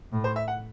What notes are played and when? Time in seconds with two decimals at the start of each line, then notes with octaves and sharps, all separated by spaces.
0.12 A2
0.24 C5
0.36 E5
0.48 F#5